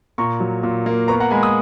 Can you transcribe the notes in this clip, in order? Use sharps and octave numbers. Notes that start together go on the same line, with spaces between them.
A#2 A#5 C#6
F#3
A#2
A#3
B3 A#5 C#6
F#5 A#5
G#3 G#5 B5
B5 D#6